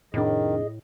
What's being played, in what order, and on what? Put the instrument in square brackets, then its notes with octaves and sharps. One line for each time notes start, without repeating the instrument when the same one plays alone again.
[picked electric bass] F1 F2 D4 [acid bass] A2 [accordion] D#3 [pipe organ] G#4 D#5